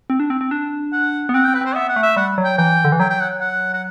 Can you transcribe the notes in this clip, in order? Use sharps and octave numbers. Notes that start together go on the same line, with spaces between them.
C4
D4
C4
C4
D4
F#5
B3
C4 F#5
G5
C4
B4
C4 C5
B3 E5
F#5
A3
E5
G3 F#5
F#3
G5
E3 G5
D3
E3
F#3 G5
G5
F#5
F#5
F#5